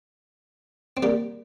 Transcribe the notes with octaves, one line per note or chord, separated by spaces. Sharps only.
C4
G3 A#3